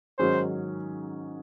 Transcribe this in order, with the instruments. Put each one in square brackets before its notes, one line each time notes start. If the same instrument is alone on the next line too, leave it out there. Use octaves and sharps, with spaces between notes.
[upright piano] G#2 D#3 F#3 C#4 G#4 [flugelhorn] C5